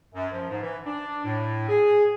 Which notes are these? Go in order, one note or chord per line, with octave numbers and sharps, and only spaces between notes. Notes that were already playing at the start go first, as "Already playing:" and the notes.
F#2
F3
G#2
E3
D4
A2
G#4